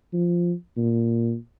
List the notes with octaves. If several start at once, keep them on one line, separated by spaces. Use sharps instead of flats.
F3
A#2